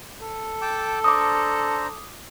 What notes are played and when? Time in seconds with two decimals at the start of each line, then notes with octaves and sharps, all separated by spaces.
0.21 A4
0.62 G5 A5 D6
1.04 D4 C5 A#5 D6 D#6